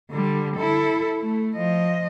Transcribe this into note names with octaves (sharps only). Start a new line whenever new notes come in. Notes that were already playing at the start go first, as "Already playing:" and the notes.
D3 G3
E4 A4
A3
F3 D#5